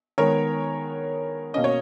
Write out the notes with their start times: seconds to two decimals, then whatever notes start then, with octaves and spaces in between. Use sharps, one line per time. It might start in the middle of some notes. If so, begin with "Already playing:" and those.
0.18 D#3 G#3 B3 A#4 C#5
1.54 B2 A#3 C#4 D#5
1.64 C#5